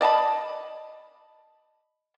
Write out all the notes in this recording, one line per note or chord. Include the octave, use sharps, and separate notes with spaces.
D5 D#5 A5 B5